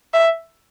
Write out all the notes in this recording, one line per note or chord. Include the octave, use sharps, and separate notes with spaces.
E5